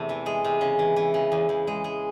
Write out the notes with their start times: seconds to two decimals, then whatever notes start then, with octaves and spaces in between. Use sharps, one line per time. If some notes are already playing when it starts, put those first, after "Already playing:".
Already playing: E2 C3 A3
0.09 E3
0.26 G#3
0.44 C3
0.61 C#3
0.79 E3
0.96 E3
1.14 C#3
1.32 E2
1.49 E2
1.67 G#3
1.84 G#3